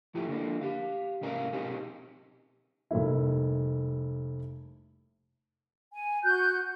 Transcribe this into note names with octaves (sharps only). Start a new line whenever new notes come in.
A2 F3 A3 E4 G4
D3 F3 A#3 D4
G4 F5
C2 G#2 C#4 A#4 F5
B2 C4 D#4 G4 G#4
F1 G3 A3 A#3 E4
G#5
F#4 F#6 G6